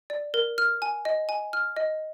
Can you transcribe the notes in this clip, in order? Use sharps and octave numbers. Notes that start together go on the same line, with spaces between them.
D5
A#4
F6
G#5
D#5
G#5
F6
D#5